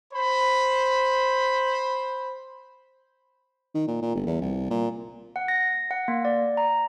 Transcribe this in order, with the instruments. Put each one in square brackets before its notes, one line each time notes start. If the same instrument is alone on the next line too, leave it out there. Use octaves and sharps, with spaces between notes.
[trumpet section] C5 B5
[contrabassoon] D#3
A#2
A#2
G1
E2
C2
A#2
[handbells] F#5
A#6
F#5
A#3
D5
A#5